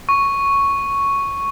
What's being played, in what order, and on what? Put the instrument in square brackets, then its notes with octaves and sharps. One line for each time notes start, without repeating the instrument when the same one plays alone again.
[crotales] C#6